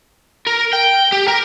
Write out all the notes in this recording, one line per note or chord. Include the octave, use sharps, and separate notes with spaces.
A#4
G5
G4
A#4